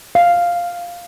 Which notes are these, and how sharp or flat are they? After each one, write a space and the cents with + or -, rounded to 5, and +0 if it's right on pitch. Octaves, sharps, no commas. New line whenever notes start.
F5 +0